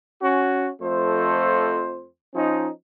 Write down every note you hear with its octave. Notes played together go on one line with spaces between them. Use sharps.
C#4 F#4
F2 F3 A3 C5
F3 C#4 D#4